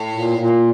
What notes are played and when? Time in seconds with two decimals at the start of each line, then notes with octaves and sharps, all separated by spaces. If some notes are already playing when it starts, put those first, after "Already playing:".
Already playing: A2
0.14 A#2
0.38 A#2